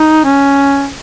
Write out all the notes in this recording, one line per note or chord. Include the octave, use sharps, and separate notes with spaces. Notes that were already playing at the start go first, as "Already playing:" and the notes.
Already playing: D#4
C#4